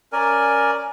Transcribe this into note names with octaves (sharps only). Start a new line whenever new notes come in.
C#4 A#4 D5 G#5